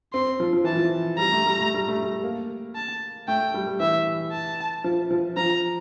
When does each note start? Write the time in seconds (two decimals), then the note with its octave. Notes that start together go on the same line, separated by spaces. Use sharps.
0.13 C4 C6
0.40 F3
0.53 F3
0.64 E3 A5
0.76 F3
1.18 G3 A#5
1.32 A3
1.46 G3
1.60 A3
1.74 G3
1.88 A3
2.02 G3
2.23 A#3
2.75 A5
3.28 A3 G5
3.54 G3
3.67 G3
3.80 E3 E5
4.32 A5
4.84 F3
5.11 F3
5.37 F3 A#5